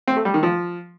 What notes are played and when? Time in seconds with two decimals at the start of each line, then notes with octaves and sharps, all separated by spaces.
0.07 C4
0.16 A3
0.25 G3
0.34 D#3
0.43 F3